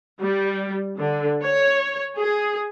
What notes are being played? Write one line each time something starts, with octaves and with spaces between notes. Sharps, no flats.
G3
D3
C#5
G#4